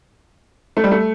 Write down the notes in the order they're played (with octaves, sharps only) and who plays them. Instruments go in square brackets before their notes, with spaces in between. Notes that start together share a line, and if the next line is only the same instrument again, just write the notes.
[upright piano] A3
G3
A3